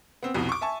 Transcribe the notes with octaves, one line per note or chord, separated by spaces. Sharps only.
B3 C4
C2 F2 B2
C#6 D6
E5 G#5 A5 C#6